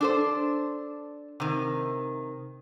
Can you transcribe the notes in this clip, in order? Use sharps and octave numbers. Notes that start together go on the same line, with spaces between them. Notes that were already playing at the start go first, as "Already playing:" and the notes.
D4 A4 C5
C3 D#3